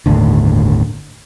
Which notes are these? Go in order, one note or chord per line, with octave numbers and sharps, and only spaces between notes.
G1 D#2 A2 D3